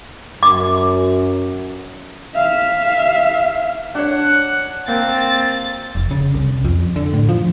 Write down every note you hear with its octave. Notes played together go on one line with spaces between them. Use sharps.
F#2 D6
E5 F5
D4 C#5 F#5
A#3 C4 A6
F1
C#3
C2
F2
D3
A2
F3